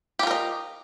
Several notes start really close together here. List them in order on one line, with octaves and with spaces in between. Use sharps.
G4 F4 A#4 D#5